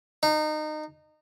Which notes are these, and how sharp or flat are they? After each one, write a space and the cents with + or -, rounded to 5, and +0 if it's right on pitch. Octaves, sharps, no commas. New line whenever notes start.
D#4 -25